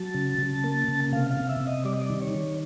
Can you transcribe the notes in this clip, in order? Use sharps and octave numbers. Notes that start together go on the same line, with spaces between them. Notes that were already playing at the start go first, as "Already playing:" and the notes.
Already playing: F#3 A5
C#3
C#3
A#3
C#3
C3 F5
F5
C3
E5
C3
D#5
G3 D5
D#5
D5
D#3
C#5
D#3